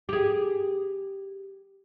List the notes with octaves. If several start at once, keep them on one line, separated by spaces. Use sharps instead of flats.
G4 G#4